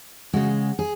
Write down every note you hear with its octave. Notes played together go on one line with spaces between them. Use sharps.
C#3 G#3 F#4
G#4